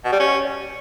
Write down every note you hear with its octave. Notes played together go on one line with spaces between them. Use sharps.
B2
G3
C#4